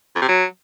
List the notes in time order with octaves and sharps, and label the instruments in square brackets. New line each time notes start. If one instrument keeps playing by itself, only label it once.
[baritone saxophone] F2
C3
F#3